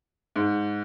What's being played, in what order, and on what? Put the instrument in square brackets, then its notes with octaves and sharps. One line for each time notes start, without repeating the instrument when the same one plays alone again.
[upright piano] G#2